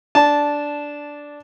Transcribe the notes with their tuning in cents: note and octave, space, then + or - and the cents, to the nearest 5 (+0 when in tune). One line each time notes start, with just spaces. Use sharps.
D4 -5 A5 -10